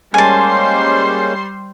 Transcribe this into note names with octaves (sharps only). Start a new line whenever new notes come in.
G3 G#3 A#3 C#4 C5 G#5 A5 C6